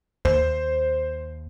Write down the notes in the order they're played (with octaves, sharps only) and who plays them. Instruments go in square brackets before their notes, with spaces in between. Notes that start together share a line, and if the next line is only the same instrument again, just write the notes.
[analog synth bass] D#2 [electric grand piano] C5